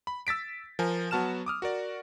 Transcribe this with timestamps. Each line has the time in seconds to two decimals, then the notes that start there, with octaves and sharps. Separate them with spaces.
0.07 B5
0.27 E6 A6 B6 D7
0.79 F3 A#4 G#5
1.11 F#3 B3 F#4 A5 F6 E7
1.46 D6 D#6 F6
1.62 F#4 A#4 D5